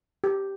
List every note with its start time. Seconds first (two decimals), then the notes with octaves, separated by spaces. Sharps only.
0.24 G4